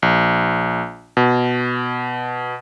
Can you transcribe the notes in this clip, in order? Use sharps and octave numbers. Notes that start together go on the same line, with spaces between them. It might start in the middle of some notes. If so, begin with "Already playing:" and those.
A#1
B2